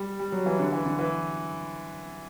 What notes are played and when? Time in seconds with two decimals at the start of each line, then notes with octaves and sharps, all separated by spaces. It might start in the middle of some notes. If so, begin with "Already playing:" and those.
Already playing: G3
0.19 G3
0.32 F#3
0.46 E3
0.59 D3
0.72 E3
0.86 D3
0.99 E3